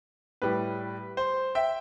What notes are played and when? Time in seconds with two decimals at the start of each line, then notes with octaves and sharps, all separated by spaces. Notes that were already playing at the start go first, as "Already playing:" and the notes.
0.42 A2 G3 B4
1.17 C5
1.55 E5 G5